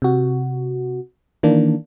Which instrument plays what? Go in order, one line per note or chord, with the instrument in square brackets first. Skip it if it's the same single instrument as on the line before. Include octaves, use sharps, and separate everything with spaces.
[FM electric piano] C3 F#4
D#3 E3 A#3 D4